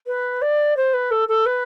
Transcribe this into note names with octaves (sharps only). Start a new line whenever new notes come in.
B4
D5
C5
B4
A4
A4
B4